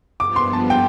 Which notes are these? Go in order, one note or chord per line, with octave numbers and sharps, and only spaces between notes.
G2 F3 B3 D6
C6
A5
G5